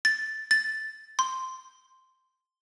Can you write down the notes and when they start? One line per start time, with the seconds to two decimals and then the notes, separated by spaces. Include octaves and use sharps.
0.05 A6
0.51 A6
1.19 C6